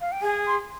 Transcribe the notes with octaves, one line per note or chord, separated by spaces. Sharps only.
F5
G5
G#4 G#5
C6